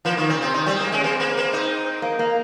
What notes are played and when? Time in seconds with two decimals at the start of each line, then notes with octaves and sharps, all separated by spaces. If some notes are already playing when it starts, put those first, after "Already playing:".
0.05 F3 A#3
0.17 D#3 A#3
0.29 C#3 C4
0.42 C3 C4
0.54 D#3 D#4
0.66 G3 C4
0.79 G#3 A#3
0.92 G#3 C#4
1.04 A#3 C4
1.20 A#3
1.37 A#3
1.53 D#4
2.02 A#3
2.19 A#3